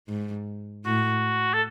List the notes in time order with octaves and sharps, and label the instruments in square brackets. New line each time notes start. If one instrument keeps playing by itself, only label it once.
[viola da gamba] G#2
[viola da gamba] A2 [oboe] F#4
[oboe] A4